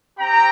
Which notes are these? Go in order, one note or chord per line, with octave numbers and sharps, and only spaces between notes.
C4 G4 G5 A#5